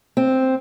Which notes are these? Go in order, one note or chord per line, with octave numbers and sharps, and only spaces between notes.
C4